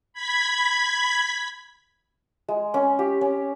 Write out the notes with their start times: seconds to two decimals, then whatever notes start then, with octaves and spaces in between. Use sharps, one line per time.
0.13 B5 G#6 B6
2.48 G#3
2.74 C#4
2.99 G4
3.21 C#4